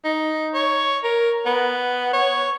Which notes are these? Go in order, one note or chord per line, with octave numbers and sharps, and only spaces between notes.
D#4
C#5
A#4
B3
C#5